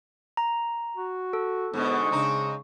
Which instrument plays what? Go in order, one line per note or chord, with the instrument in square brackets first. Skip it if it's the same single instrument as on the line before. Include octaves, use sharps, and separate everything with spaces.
[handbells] A#5
[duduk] F#4
[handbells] A4
[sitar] G#2 B2 D3 [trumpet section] G#3 C#6 [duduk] B3
[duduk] C#3 [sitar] C4 D4 D#4